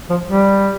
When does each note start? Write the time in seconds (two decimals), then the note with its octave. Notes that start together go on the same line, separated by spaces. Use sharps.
0.10 F3
0.28 G3